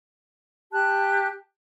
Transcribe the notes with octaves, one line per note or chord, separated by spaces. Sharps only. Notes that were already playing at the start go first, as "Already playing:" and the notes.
G4 A5 F#6